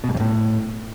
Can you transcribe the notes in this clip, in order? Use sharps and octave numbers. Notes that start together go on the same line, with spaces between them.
B2
G#2
F2
A2